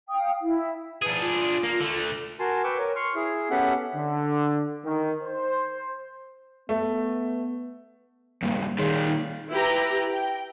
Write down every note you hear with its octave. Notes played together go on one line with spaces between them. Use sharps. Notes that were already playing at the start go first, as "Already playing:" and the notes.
F5 G5 D#6
E4
D4 G#4 B4
F4
A#3
D3 A3
F#4 A#4 G#5 A5 C6
B4 G5 C#6 D6 E6
A#4 C#5
C6 C#6 F6
E4 G#4
B3 C#4 G4 A4 E5 F#5
D3
D#3
C5
A3 B3
C#2 G2 G3 A#3
A#2 D#3 G#4 C#5 C6
D#4
E4 G4 B4 G5 A#5
G5